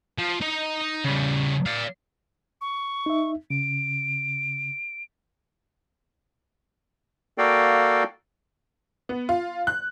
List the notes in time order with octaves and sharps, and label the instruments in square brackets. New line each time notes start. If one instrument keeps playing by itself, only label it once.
[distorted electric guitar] F3
D#4 D#5
C#3 G3
D5 F5
[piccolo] C#6
[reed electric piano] D#4 E5
[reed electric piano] C#3 [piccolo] D7
[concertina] A#3 F#4 A4 D5 F5 G5
[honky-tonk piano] B3
F4
F#6